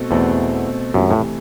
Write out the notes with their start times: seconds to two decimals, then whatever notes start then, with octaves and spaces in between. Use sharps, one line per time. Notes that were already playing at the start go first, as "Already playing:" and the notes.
Already playing: B2 A3 C4 F#4 A4
0.11 E2 B2 A3 C4 F#4 A4
0.94 F#2 C3 E3 A3
1.11 A2